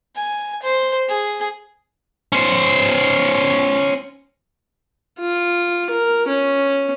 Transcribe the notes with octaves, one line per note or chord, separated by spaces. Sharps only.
G#5
C5
G#4
C#4 C5
F4
A#4
C#4